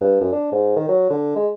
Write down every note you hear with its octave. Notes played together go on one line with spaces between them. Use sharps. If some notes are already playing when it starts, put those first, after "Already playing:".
G2
F#2
D4
G#2
D#3
F#3
D3
G#3